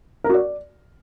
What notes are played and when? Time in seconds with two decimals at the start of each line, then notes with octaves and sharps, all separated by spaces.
0.24 A#4
0.29 F#4
0.34 D5